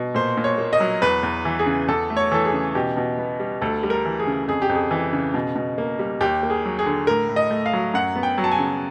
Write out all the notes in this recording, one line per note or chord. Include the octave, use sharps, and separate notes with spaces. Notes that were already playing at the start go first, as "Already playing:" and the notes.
Already playing: B2
A#2 C5
A#2
C#5
A#3
D#5
F#3
E2 B4
E2
E3
G#4
C#3
E2 A4
A3
C#5
E3 A4
G#4
C#3
B2 G4
B2
B3
G3
D2 A4
G3
A#4
E3
G#4
C#3
F2 G#4
G4
F2
G#4
E3
C#3
B2
B2
A#3
G3
D#2 G4
A#3
G#4
F#3
G#4
D3
A2 A#4
A2
D#5
A3
F5
F#3
F#2 F#5
B3
G5
F#3
A5
G#5
C#3